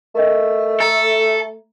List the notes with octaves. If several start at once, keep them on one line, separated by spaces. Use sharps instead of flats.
A3 A#4 D#5
A4 A#5